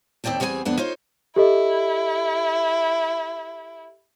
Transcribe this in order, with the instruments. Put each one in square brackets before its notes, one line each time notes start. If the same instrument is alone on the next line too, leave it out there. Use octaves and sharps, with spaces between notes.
[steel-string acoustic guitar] D#2 C4 D5 G5 A5
E2 G3 C4 F#4 G#4 G#5
F2 B3 D4
D#4 F4 C5 C#5
[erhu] E4 [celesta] G4 A4 D#5